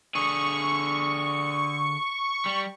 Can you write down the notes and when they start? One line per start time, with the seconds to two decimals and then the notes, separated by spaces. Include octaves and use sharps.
0.15 D3 G#4 C#6
2.46 G3